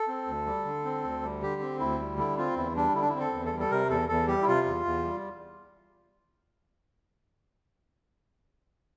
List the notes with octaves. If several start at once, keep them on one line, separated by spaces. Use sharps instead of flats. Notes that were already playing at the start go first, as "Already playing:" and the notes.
Already playing: A4
C4
D2
G3
D3
C4
D2
G3
D3 G4
C4
D2 E4
G3
D3 E4
C4 F4
E2 E4
G3 D4
D3 E4
D4
C4 E4
A4
E2
A4
G3
A4
C3 A#4
E2 A4
E2 A4
G3 G4
E4
C3 F4
E2
E2
G3